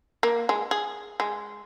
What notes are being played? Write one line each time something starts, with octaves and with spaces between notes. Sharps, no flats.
A#3
G#3
G#4
G#3